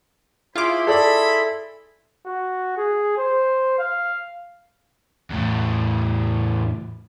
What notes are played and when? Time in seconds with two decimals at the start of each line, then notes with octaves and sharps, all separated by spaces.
0.56 E4 F4 G#4 C5 B5 C6 D6
0.87 A4 D5 E5 B5
2.26 F#4
2.77 G#4
3.17 C5
3.79 F5
5.30 E2 A2